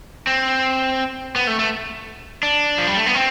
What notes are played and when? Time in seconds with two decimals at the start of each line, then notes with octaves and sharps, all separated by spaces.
0.27 C4
1.36 B3
1.47 A3
1.59 A3
2.43 D4
2.78 F3
2.87 G3
2.97 A3
3.06 B3
3.15 C4